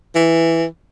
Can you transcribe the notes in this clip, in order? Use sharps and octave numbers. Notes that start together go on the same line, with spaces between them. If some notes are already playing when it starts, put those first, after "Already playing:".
E3